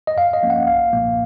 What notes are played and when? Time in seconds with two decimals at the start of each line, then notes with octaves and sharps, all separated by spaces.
0.07 D#5
0.16 F#2 F5
0.33 D#5
0.43 F3 A#3 C#4
0.50 F#5
0.67 B1 F5
0.93 A#2 F3 A#3